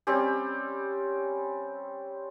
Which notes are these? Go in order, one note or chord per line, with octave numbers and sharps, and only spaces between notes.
G3 C4 C#4 G4